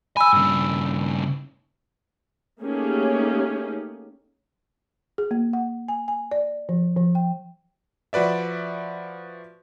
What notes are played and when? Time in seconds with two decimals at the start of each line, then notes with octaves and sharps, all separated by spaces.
0.17 G#5 B5 E6
0.33 G2 C#3
2.62 A3 A#3 C#4 D#4 G4 G#4
5.18 G#4
5.31 A#3
5.53 F#5
5.88 G#5
6.08 G#5
6.31 D5
6.69 F3
6.97 F3
7.15 G5
8.13 F3 F#4 B4 D5 E5